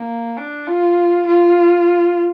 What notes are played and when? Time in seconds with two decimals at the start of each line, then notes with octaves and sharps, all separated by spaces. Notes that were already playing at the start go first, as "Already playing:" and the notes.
Already playing: A#3
0.37 D4
0.67 F4
1.26 F4